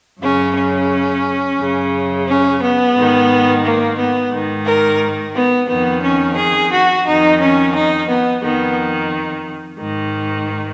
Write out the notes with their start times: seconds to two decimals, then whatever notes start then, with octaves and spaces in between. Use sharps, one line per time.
0.21 F#2 C#3 C#4
0.55 C#4
1.58 F#2 C#3
2.27 C#4
2.61 B3
2.95 G#2 D#3
3.64 A#3
3.98 B3
4.31 G#2 D#3
4.66 A#4
5.34 B3
5.68 F2 D#3 B3
6.02 C#4
6.37 G#4
6.70 F#4
7.05 F2 D#3 D#4
7.39 C#4
7.74 D#4
8.08 B3
8.42 F2 D#3 B3
9.79 G#2 D#3